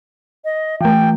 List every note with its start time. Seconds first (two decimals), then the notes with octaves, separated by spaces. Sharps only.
0.45 D#5
0.81 E3 A3 G5